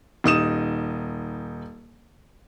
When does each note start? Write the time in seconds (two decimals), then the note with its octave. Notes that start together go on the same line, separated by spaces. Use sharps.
0.24 D#1 D#4 D#6 E7